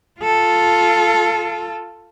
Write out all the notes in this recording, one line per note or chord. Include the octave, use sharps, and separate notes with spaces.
F4 A4